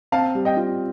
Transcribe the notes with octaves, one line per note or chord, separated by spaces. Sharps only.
C4 F5 A5
G3
D#5 G5
F4